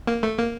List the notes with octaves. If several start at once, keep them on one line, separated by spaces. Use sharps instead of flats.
A#3
A3
A#3